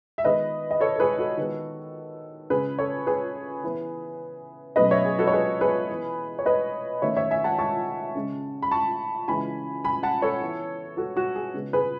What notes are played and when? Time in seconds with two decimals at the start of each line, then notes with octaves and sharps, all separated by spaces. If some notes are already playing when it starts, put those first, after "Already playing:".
0.18 E5
0.25 D#3 G#3 B3 B4 D#5
0.71 D#5
0.80 A4 C#5
0.96 A4
1.00 G#4 B4
1.18 F#4 A4
1.37 D#3 G#3 B3
2.50 C#3 G#3 C#4 G#4 B4
2.79 A4 C#5
3.07 G#4 B4
3.64 E3 B3
4.76 B2 F#3 A3 C#4 B4 D#5
4.91 C#5 E5
5.05 G#4
5.19 F#4 A4
5.27 C#5
5.32 G#4 B4
5.61 G#4 B4
5.89 E3 B3
6.39 C#5
6.46 B4 D#5
7.02 D#3 A3 C#4 C#5 E5
7.16 C#5 E5
7.31 E5 G#5
7.44 F#5 A5
7.59 A5 C#6
8.15 C#3 G#3 C#4
8.62 B5
8.71 A5 C#6
9.28 C#3 E3 G#3 C#4 G#5 B5
9.84 G#5 B5
10.03 F#5 A5
10.22 A4 C#5
10.42 E3 B3
10.97 F#4 A4
11.17 F#4
11.35 G#4
11.54 C#3 G#3 B3
11.73 G#4 B4